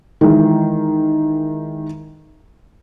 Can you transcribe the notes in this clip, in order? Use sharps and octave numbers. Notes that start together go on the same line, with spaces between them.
D#3 E3 G#3